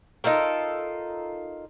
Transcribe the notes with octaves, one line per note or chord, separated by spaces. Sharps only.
D#4 F4 A4 A#4